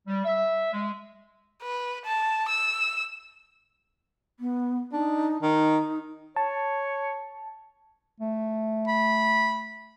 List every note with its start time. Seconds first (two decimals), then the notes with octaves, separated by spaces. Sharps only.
0.07 G3
0.24 E5
0.72 G#3
1.62 B4
2.05 A5
2.49 E6
4.40 B3
4.92 D4 D#4
5.42 D#3 D#4
6.36 C#5 A5
8.20 A3
8.88 B5